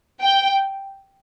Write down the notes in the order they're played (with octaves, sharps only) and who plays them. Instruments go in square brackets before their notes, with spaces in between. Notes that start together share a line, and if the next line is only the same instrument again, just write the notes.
[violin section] G5